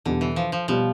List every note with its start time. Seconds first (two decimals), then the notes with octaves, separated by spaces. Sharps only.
0.05 E2 B2 D3 G3
0.21 E3
0.36 F3
0.52 F3
0.68 B2 F3 G3